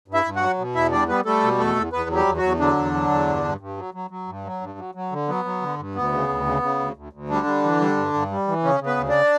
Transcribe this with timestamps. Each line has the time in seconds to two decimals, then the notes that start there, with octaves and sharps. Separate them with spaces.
0.08 G2
0.14 E4 E5
0.25 G2
0.36 F#4 F#5
0.42 F#3
0.58 B2
0.75 E2 E4 E5
0.92 G3 D4 D5
1.09 G3 B3 B4
1.25 G3 A3 A4
1.43 B2
1.59 E2 A3 A4
1.76 E2
1.93 E2 B3 B4
2.09 F#3
2.15 G3 G4
2.26 E2
2.37 F#3 F#4
2.43 E2
2.60 D3 F#3 D4
2.76 E2
2.94 F#3
3.10 E2
3.27 G2
3.44 G2
3.60 G2
3.77 F#3
3.94 F#3
4.11 F#3
4.28 G2
4.45 F#3
4.61 G2
4.78 F#3
4.95 F#3
5.12 D3
5.28 F#3 B3
5.45 F#3
5.62 D3
5.78 G2
5.95 D2 B3
6.12 C#3
6.29 D2
6.45 C#3
6.62 C#3
6.79 D2
6.96 D2
7.13 D2
7.29 D3 G3 D4
7.46 G3
7.63 E3
7.80 G3
7.97 G2
8.14 G2
8.31 G3
8.48 E3
8.63 C#3 C#4
8.80 C#3
8.86 B3 B4
8.97 D2
9.09 D4 D5